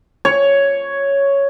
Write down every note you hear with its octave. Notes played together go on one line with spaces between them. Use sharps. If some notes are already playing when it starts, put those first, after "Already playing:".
C#5